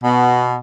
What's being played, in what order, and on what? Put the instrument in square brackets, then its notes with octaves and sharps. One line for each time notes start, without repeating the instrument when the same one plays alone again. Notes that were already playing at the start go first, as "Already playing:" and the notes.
[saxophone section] B2